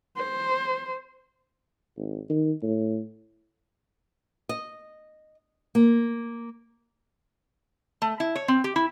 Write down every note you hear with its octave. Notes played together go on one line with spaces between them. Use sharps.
C5
G#1
D#3
A2
D#5
A#3
A3
E4
C#5
C4
G4
E4